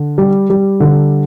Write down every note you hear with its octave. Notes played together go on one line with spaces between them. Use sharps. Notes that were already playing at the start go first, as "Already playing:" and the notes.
Already playing: D3
G3
G3
D3